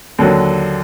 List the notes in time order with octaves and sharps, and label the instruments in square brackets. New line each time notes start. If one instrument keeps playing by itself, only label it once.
[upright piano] D#2 D3 F#3